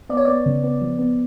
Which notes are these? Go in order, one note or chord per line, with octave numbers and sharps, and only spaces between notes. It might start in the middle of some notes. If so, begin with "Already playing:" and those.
B3 D5
C#5
B3 D5
C#3
B3
F3
B3